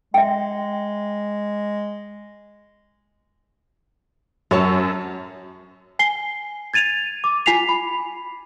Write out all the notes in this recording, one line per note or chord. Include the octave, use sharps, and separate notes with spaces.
G#3 E5 G5
F#2 F#3 C#5 A5
G#5 C7 G7
G#6 A6 D#7 F7
D6
F4 G#5 B6 C7 F7
B5